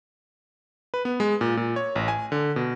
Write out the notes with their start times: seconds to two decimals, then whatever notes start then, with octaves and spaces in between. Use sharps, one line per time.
0.94 B4
1.05 B3
1.20 G#3
1.41 A#2
1.57 A#2
1.76 C#5
1.96 A1
2.08 G#5
2.32 D3
2.56 B2